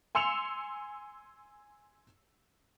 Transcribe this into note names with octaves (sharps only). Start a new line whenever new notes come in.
G#5 C6 E6 C#7 E7 F7